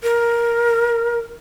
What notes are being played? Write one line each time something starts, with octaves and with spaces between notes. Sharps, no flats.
A#4